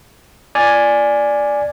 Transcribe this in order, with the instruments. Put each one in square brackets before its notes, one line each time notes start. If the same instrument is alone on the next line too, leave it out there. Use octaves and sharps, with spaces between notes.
[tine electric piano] D5 G#5